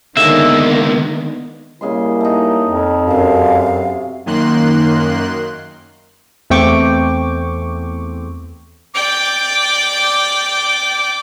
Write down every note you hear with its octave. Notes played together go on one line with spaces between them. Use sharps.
C#2 D3 D#3 G#3 A#3 B3 C#5 E5
C#3 G3 A#3 E4 D#5 C6
A3 D#4
F2
F#2 C3 G#4 E5 F5
F#2 D#3 A#3 C6 F#6
E2 A3 C4 G5 C#6 D6
D5 G5 D6